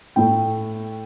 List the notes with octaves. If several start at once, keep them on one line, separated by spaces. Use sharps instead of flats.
A2 A3 G5